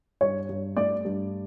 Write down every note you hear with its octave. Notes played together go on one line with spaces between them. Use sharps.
G2 C#5
G2
A3 D5
G2